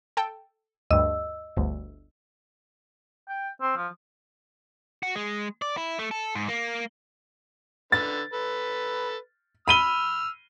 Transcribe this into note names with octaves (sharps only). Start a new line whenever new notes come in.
A4 G5 A5
D2 G2 D#5 E6
G1 D2
G5
C4
F3
F#4
G#3
D5
E4
A3
A4
G#2
A#3
D3 A4 B4 A6
A4 B4
B5 E6 F6 D#7 G7